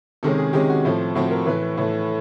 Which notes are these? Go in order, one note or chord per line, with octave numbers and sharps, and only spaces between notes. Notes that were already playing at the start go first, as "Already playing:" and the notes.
C3 D#3 G#3 C#4 A4
G#4
C3 D#3 G#3 C#4 G4
F#4
A2 F3 A3 C4
A2 F3 A3 C4 F#4
A#4
A2 E3 A3 B4
A2 E3 A3